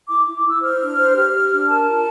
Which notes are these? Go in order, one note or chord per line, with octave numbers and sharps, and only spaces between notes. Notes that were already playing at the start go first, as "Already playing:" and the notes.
E4 D6
E4
D6
E4
E6
C5 F6
D4
C5
G4
G4
D4
A#4 A5
F4